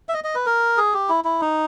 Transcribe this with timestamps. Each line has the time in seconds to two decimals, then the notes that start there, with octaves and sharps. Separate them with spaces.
0.09 E5
0.14 D#5
0.24 D#5
0.35 B4
0.46 A#4
0.77 G#4
0.94 G4
1.09 E4
1.24 E4
1.41 D#4